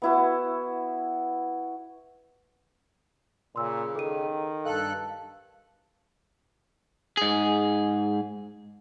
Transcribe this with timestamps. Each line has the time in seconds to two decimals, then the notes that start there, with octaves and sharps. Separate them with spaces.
0.02 B3 E4 F#4
3.56 A#2 C#3 C6 E6
3.95 D#3 A4 D#7
4.65 G2 A4 F5 A5 F#6
7.17 G#2 G#4